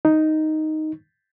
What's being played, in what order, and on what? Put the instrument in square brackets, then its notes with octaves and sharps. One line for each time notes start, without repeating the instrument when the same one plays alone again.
[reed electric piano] D#4